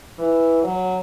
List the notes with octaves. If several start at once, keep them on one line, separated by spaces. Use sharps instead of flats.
E3
F#3